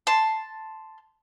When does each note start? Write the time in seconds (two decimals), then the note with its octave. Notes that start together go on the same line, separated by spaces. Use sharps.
0.07 A5 C6